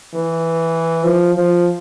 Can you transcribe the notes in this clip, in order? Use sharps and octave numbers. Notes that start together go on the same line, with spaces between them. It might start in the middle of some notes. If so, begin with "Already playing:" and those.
E3
F3
F3